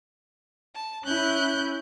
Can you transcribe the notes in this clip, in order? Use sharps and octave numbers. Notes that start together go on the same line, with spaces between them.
A5
C#4 E4 F#6 G6